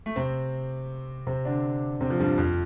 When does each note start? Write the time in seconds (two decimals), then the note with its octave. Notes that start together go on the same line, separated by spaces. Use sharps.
0.06 A3
0.16 C3 C4
1.27 C3 C4
1.45 D3 D4
2.01 C3 C4
2.10 F3
2.19 G2 G3
2.38 F2 F3